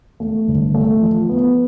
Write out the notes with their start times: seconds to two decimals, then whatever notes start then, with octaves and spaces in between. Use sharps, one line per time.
0.20 A3
0.48 G1
0.74 A3
1.02 F3
1.29 B3